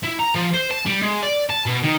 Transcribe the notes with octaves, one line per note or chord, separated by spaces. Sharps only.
E4
A#5
F3
C5
A5
G3
G#3
D5
A5
B2
D#3